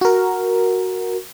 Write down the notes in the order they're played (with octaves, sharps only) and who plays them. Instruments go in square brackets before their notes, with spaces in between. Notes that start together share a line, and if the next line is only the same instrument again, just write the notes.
[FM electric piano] F#4 A#4